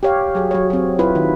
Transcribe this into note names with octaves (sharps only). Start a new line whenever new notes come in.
G4 C#5 F5
F#3 G#4
F#3 C#5
F#3 C4
E4 F4 B4
D#3